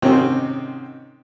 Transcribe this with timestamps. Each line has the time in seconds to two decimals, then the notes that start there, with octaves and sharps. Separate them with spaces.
0.02 G#2 C3 D#3 C4 C#4 D#4